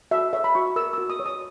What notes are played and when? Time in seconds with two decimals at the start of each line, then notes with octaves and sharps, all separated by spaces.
0.11 F#4 E5
0.33 C#5 E5
0.44 B5
0.55 F#4 C#6
0.76 A#4 E6
0.93 F#4 E6
1.10 D#6
1.20 C#5
1.26 D#6